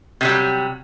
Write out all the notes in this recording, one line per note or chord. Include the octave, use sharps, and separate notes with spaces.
C3 F#3 G3